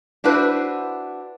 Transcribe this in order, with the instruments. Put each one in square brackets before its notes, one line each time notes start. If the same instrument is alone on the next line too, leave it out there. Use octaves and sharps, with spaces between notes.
[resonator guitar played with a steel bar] D4 E4 F#4 B4 C5